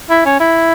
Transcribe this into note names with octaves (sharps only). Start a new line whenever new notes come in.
E4
C#4
E4